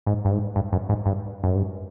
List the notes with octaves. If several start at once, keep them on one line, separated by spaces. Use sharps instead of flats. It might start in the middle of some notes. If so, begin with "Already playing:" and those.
G#2
G2
G#2
G2
F#2
G#2
G2
F#2
G2